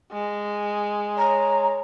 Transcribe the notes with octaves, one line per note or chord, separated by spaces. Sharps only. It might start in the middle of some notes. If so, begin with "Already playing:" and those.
G#3
C#5 A#5